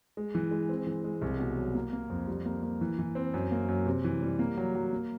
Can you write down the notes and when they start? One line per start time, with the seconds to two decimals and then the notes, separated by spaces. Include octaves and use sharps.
0.17 G#3
0.35 E3
0.51 G#3
0.69 C4
0.87 E3
1.04 G#3
1.22 C2
1.39 B2
1.58 F#3
1.74 A#3
1.93 A#3
2.10 F2
2.28 G3
2.45 A#3
2.63 A#3
2.81 E3
2.99 E3
3.15 C4
3.34 F#2
3.52 A#3
3.68 F#2
3.86 C3
4.04 E3
4.22 G3
4.39 A#3
4.57 F#3
4.75 F#3
4.92 A#3